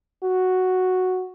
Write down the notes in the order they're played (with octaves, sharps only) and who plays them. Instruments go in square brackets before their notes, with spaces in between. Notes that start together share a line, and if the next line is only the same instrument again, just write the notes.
[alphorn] F#4